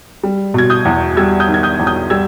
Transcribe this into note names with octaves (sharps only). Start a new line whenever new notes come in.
G3
B2 G#6
D#6 G6
E2
G3 E6 G#6
D#6 G6
D#3
G#6
D#6 G6
E2
D#6 G6
G3 E6 G#6